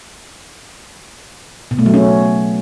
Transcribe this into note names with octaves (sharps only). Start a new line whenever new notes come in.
B2
A3
F#3
C#4